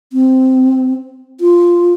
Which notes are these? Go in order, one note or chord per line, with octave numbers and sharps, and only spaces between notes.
C4
F4